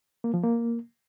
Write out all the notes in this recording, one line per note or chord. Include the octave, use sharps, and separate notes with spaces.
A#3
F3
A#3